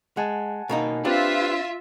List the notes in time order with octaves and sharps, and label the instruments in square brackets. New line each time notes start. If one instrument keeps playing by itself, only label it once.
[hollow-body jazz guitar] G#3 [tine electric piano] F#5 G#5 A5
[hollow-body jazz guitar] B2 A#3 D#4
[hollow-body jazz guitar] C4 D4 [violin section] F4 E5 [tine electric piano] G4 B4 F#6